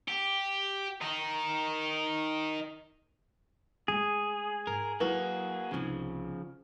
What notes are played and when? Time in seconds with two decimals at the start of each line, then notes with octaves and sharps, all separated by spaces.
0.08 G4
1.01 D#3 D#4
3.88 G#3 A3 G#4
4.67 G#2 A#4
5.00 F#3 A#3 E4 F#4 A#4 B4
5.71 C2 C#3 F3 D#4